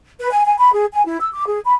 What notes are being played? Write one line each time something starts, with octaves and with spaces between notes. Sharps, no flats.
B4
G#5
G#5
B5
G#4
G#5
E4
E6
D6
G#4
B5